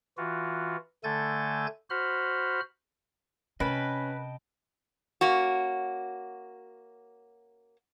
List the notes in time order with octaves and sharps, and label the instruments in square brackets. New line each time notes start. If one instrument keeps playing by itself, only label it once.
[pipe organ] E3 F4 F#4
D3 A3 A4 G#5 G6 A6
F#4 C5 B5 F6
[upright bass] C3 [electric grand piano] C#4 [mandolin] B4 [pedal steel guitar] D#5 G5 A5
[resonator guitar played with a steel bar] A#3 C#4 F#4